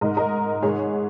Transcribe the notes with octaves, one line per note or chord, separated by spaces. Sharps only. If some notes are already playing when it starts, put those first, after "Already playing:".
G#2 D#3 A#4 D#5
A#4 D#5
G#2 D#3 G#4 C#5